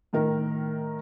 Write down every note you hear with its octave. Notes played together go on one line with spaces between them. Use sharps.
A2 D#3 A#4